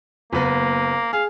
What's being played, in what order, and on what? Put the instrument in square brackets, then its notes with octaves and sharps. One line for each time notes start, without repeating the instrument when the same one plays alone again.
[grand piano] F#1 B3 [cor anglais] A#3
[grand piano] G#4 [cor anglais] F5